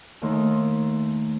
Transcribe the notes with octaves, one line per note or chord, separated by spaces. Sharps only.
D#2 D#3 A3 E5 C6